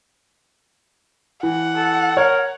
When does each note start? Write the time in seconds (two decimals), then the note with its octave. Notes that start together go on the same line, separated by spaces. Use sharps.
1.43 E3 F#5
1.76 A4
2.17 A#4 C#5